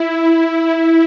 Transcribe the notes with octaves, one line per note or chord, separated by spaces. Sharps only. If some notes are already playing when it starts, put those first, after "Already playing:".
Already playing: E4